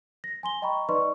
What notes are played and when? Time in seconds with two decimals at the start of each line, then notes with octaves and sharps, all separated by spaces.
0.24 A#6
0.43 G#5 C6 G7
0.62 D#5 G5 A#5 B5 C#6
0.89 D#4 B4 D5 D#5 C6 C#6